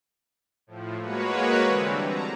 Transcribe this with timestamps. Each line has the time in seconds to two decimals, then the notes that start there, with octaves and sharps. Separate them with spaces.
0.67 A2 F3
1.00 G#3 A#3 F#4 B4 C#5
1.65 D3 E3 G3 C4
2.04 A5 A#5